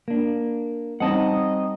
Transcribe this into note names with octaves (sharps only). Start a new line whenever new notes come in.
A#3 D4
G3 C4 D#4 D#5 F#5 A5